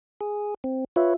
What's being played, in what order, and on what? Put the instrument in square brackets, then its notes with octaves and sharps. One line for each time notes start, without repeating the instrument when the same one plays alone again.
[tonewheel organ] G#4
C4
[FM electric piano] F4 E5 [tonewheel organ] B4 C#5